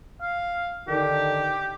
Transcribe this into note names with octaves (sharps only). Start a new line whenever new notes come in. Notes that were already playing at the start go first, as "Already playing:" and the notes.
F5
D3 D#3 G4